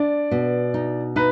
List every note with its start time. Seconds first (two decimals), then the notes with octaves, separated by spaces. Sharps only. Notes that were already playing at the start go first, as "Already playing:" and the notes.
Already playing: D4 D5
0.31 B2
0.74 D#4
1.16 D#4 B4